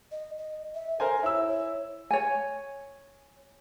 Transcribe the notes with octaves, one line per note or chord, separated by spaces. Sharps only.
D#5
D#5
E5
A4 A#4 C5 G#5
E4 C#5 E6
C#5
C#5 G#5